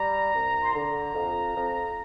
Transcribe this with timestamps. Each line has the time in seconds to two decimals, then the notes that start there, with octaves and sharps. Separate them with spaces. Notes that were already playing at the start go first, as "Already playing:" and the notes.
Already playing: G3 A#5
0.33 C2
0.63 C6
0.74 D3 A#5
1.15 F2
1.56 F2